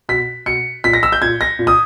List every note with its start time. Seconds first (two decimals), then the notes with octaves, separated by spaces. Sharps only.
0.09 B2 B6
0.46 B2 C#7
0.84 A#2 B6
0.93 A#6
1.03 E6
1.12 G6
1.22 A#2 G#6
1.41 A#6
1.59 A#2
1.67 D#6